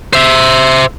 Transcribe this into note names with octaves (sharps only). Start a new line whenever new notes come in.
C5 E5